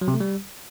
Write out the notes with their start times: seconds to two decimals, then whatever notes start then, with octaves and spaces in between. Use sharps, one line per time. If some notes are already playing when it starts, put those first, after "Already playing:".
0.01 F#3
0.08 C3
0.14 A3
0.20 G3